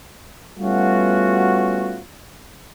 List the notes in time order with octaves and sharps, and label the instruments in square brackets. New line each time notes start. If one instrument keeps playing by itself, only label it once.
[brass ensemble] G3 A3 B3 C#4 F4 F#4